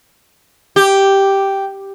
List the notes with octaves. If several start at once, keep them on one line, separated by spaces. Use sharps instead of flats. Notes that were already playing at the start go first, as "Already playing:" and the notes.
G4